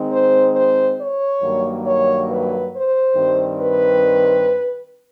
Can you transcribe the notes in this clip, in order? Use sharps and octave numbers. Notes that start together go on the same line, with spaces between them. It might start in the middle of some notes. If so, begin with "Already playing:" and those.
Already playing: D#3 G#3 C4 D#4
C5
C5
C#5
G2 D#3 F#3 A#3
C#5
B4
C5
G2 D#3 G3 C4
B4